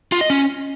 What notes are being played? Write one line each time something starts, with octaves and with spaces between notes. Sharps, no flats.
F4
D#5
C#4